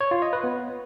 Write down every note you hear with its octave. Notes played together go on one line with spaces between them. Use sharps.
C#5
F4
D#5
B4
B3